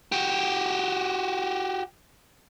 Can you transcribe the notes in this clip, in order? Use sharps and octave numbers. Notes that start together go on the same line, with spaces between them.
F#4 G4